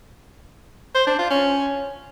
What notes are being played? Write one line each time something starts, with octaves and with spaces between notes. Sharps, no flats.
C5
D4
F4
C#4